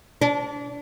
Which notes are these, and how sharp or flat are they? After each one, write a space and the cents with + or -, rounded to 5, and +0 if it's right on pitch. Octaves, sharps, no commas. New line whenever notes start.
D4 -30